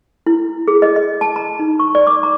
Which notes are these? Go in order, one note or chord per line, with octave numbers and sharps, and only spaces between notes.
E4
G#4
D#5
D#5
A5
A#5
D#4
C#6
D5
D6
A#5